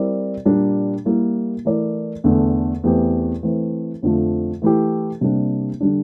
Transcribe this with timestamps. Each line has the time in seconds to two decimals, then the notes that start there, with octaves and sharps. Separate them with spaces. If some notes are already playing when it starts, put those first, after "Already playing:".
Already playing: G3 C4 E4 A#4 D5
0.46 A#2 G3 A#3 D4
1.05 G3 A#3 E4
1.65 E3 A3 E4 A#4 D5
2.24 E2 D3 A3
2.84 E2 E3 A3 C4 G4
3.43 E3 A3 C4
4.02 F2 D3 F3 A3
4.62 E3 A3 E4 G4
5.21 C3 G3 A#3 D4
5.80 D3 G3 D4